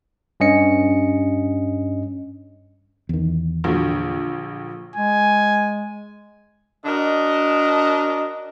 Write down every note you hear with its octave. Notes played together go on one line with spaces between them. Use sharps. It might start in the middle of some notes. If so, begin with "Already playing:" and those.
G2 C#4 D#5 C#7
E2 D#3
A#1 D3 F#3
G#3 G#5
D4 F#4 A#4 D#5